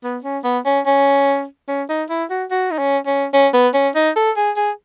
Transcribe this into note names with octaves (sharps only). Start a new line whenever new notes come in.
B3
C#4
B3
C#4
C#4
C#4
D#4
E4
F#4
F#4
D#4
C#4
C#4
C#4
B3
C#4
D#4
A4
G#4
G#4